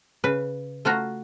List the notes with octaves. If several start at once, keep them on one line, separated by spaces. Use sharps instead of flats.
C#3 B4
A3 F4 F#4 A#5